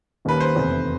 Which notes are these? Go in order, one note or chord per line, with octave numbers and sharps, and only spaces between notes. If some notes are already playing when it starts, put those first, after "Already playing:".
D#2 D#3 G3 A#3 C#4 B4
C5
F1 E2 C3